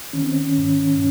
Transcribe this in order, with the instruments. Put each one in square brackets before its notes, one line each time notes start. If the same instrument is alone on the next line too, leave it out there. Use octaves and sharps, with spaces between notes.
[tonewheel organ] D#3 C#4
C4
C#4
G#2